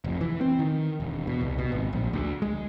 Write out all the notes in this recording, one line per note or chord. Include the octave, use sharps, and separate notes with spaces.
F1
E3
C4
D#3
E1
B2
C2
B2
G#1
A#1
D2
G#3